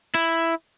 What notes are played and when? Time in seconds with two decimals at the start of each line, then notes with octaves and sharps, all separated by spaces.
0.14 E4